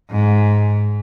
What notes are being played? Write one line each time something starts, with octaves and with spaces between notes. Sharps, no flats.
G#2